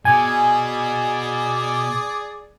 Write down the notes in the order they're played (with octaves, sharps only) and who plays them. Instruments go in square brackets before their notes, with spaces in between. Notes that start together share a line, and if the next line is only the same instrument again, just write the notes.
[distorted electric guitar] B2 [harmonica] G#4 D5 [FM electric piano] G#5